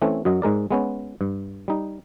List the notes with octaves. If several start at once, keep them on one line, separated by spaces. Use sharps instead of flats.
E3 A3 C4 C#4
F#2 F#3 D#5
G#2 G#3 A#4 D5
G#3 B3 C#4
G2
G3 D#4